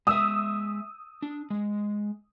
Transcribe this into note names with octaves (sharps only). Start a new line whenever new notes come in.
G#3 E5 D#6 E6
D4
G#3